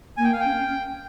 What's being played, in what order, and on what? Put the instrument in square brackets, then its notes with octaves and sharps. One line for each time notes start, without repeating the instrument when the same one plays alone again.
[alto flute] A#3 [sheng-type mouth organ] G#5
[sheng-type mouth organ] G5
F5
[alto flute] C#4 [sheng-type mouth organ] G5